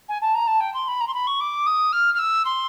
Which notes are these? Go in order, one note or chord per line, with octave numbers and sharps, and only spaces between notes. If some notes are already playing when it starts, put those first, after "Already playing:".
G#5
A5
A#5
A5
G5
C6
B5
A#5
C6
B5
C#6
D6
D#6
F6
F6
E6
C6